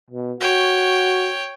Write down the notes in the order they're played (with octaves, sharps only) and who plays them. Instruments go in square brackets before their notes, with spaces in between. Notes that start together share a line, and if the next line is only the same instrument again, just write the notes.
[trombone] B2
[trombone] F#4 [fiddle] C#5 G5